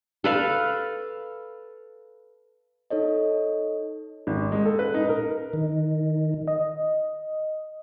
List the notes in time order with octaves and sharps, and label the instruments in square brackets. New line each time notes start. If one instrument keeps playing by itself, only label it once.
[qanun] A4 B4 F5
[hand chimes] D#4 A4 C#5 D#5
[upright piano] G#1
G#3
A4
B4
D#4
A#4
[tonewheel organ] D#3
[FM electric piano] D#5